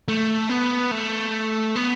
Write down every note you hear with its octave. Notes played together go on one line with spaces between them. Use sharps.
A3
B3
A3
B3